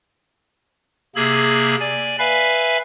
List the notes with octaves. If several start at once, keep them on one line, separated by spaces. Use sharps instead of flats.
C3 A#3 G#4 B5 E6 G#6
D5 G#5
B4 E5 F5 G#5 B5